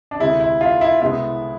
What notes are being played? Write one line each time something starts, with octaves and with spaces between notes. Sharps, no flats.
D4
D2 C3 G#3 E4
E4
F4
E4
C2 B2 G#3 B3 E4